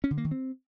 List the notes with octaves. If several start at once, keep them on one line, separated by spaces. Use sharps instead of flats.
C#4
D3
A#3
D#3
C4